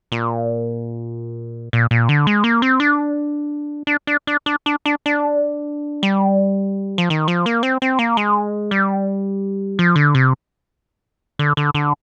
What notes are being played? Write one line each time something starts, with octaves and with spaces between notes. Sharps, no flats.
A#2
A#2
A#2
D3
G#3
A#3
C4
D4
D4
D4
D4
D4
D4
D4
D4
G3
F3
D#3
F3
A#3
C4
C4
A#3
G#3
G3
F3
D3
C3
D3
D3
D3